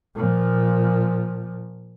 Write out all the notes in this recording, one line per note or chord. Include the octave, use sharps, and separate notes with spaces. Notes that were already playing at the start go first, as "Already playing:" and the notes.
A#2 F3